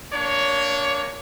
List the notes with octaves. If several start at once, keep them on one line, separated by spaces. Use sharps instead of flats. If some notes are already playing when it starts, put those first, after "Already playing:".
A#3 D4 C#5